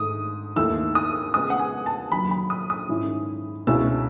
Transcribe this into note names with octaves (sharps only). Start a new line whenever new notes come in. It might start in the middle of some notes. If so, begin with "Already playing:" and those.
Already playing: G#2 D#3 A3 D#6
D#2 D#3 A3 E4 E6
D#6
C#3 G#3 B3 D#6
F#5
G#5
A5
D#2 C#3 F#3 C#4 B5
B5
D#6
D#6
G#2 D#3 G#3 C#4 E4
C#2 B2 G#3 C#4 E4 E6